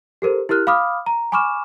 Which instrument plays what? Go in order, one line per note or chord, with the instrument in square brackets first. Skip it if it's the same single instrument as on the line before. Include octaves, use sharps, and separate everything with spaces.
[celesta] G4 A4 A#4 C5
E4 G4 A#4 F6 F#6
F5 B5 D6 D#6 F6
A#5
G#5 B5 C#6 D6 F6 E7